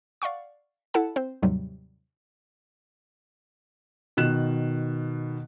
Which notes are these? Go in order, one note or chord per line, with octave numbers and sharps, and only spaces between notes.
D5 F5 F#5 C#6
E4 A4 F#5 A5
C4 C5
D#2 G#2 C3 F#3 G3
B2 D#3 F#6 E7